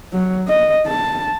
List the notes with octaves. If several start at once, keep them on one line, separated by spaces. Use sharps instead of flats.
F#3
D#5
A5